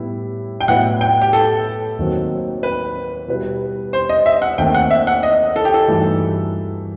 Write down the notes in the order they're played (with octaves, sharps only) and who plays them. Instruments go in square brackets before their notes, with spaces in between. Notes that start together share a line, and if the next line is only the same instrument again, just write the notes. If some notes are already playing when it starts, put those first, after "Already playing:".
Already playing: [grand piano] A2 G3 B3 E4 G4
[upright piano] G5
[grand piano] A2 F#3 B3 E4 B4 [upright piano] F#5
[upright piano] G5
G4
A4
[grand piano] D#2 D#3 F#3 C4 F#4
[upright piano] B4
[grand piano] B2 G3 B3 E4 B4
[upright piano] C5
D#5
E5
F#5
[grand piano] D#2 D#3 A3 C4 [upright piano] G5
[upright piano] F#5
E5
F#5
D#5
A4
G4
A4
[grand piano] G2 E3 A3 D#4 F#4